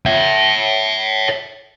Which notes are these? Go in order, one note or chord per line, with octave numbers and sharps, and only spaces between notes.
C#5 E5